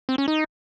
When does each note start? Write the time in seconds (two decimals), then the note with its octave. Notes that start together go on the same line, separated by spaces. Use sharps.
0.09 C4
0.18 C#4
0.28 D#4